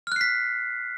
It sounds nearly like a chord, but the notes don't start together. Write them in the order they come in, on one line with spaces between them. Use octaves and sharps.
F6 F#6 C7 B6